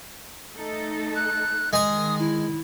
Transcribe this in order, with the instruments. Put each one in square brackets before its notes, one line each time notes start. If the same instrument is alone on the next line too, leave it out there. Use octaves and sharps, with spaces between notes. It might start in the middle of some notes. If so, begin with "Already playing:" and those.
[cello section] A3 D#4 A4
[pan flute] F#6
[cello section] D#3 [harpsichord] G#3 G#5 [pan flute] D#6
[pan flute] E4